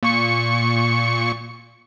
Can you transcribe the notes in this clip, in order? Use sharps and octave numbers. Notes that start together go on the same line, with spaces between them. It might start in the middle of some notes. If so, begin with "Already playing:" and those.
A#2 C#6 C#7